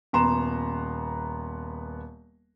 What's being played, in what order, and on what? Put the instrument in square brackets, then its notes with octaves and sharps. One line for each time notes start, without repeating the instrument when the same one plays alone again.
[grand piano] D#1 B3 A#5 C6 E7